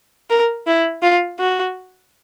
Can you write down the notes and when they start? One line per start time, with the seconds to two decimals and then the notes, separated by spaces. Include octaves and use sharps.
0.30 A#4
0.67 E4
1.03 F4
1.39 F#4